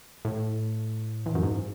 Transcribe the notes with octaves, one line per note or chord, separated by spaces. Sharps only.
A2
E2
F#2
G#2